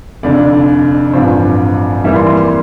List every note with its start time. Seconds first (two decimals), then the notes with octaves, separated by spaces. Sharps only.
0.23 F1 F2 D3 D5
1.13 A1 G2 F3 C4
2.04 F2 E3 G3 A#3 E5
2.16 C6
2.27 C6
2.37 C6